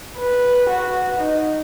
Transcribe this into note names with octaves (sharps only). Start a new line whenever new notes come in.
B4
F#4
D#4